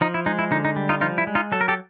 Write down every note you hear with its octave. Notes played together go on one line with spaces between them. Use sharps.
F3 D#4
E4
G#3 D#4
E4
D3 D#4
D#4
G3
D#4 F4
F3 D#4 F4
E4
G#3
D#4 F4
F#3 A4
A#4
G4 A4